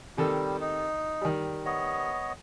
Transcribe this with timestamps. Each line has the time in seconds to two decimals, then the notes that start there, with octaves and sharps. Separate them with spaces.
0.17 C3 D#3 G3 A4
0.60 D#4
1.21 D#3 G3
1.65 B3 C#5 D#5